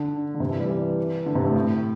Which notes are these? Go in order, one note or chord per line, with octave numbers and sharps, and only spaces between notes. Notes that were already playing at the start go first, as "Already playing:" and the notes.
Already playing: D3
D3
C3
E3
G3
E3
D3
C3
A2
A2